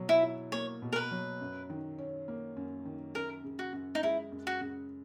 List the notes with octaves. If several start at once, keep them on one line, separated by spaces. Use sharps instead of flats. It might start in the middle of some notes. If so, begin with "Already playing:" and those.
Already playing: B2 F#3
E4
E4
A#3 C#5
B2
A#4
B4
F#3
F#2
D#3
C#4
A#3
F#2
D#3
F#2 A#4
C#3
F#4
F#2
D#4
G#3 E4
F#2
F#4
C#3